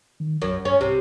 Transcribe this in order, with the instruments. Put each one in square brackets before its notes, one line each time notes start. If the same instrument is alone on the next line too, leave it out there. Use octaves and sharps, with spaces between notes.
[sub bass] D#3
[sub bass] B1 [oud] F#2
[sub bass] G2 [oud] C#4
[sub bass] C2 [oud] C3